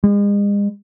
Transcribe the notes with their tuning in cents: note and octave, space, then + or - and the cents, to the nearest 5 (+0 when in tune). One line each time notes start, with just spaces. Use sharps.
G#3 -40